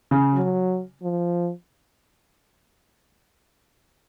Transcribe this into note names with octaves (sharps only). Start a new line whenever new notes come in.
C#3
F#3
F3